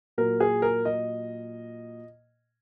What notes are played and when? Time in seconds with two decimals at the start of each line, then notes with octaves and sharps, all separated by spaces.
0.18 A#2 F#3 A#4
0.40 G#4
0.62 A#4
0.85 D#5